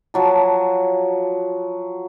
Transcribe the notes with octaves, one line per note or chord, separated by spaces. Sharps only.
F3 F#3 A5